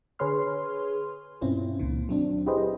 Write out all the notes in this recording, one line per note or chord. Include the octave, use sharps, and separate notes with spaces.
D3 G#4 B4 C#5 C6 F6
G2 B2 C4 C#4 E4 F4
C#2 A#2 D#3
F#3 C4 D4
E4 G4 G#4 B4 C5 D#5